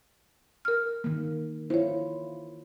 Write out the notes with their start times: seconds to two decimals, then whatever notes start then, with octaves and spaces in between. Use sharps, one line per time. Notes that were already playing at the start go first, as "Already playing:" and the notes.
0.65 A#4 F6
1.04 D#3 A#3
1.70 E4 F4 C5 C#5